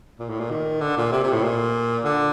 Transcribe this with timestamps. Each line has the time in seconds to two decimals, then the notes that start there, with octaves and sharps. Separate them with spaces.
0.19 A#2
0.30 A2
0.40 A#2
0.51 D#3
0.81 D3
0.97 A#2
1.12 C3
1.23 C3
1.33 A2
1.43 A#2
2.05 D3